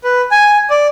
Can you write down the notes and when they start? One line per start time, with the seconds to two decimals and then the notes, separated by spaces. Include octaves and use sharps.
0.04 B4
0.31 G#5
0.70 D5